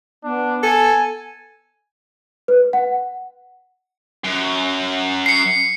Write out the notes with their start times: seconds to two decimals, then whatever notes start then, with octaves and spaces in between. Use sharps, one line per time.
0.24 B3 D4
0.63 A4 G#5
2.48 B4
2.73 F#5
4.24 F#2
5.26 C7 C#7